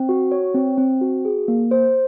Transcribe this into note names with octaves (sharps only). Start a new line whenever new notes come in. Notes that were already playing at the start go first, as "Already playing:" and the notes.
Already playing: C4
F#4
C#5
C4
C4
F#4
G#4
A#3
C5